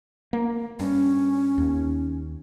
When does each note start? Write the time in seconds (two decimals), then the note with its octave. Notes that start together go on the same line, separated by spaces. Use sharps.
0.33 A#3
0.80 G2 C#4
1.58 D#2